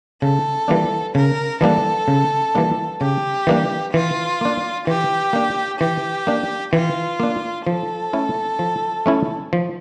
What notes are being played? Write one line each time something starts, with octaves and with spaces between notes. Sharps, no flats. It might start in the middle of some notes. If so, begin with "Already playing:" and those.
C#3 A4
E3 G3 A#3 D4
C#3 A#4
E3 G3 A#3 D4 A4
C#3
E3 G3 A#3 D4
C#3 G4
E3 G3 A#3 D4
E3 F4
A#3 D4
E3 G4
A#3 D4
E3 G4
A#3 D4
E3 F4
A#3 D4
F3 A4
A3 C#4 E4
F3
A3 C#4 E4
F3